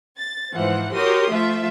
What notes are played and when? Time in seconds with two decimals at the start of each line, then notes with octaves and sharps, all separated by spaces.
0.16 A6
0.53 G#2 E3 F3 C5 F#5
0.95 F#4 G4 A#4 C#5 C6 D#6
1.31 F3 A3 F4 E5